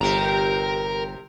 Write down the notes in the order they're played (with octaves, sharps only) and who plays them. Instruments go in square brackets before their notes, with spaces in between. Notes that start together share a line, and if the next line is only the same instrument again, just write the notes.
[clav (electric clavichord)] G1 [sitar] C3 G4 [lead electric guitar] A#4 A#5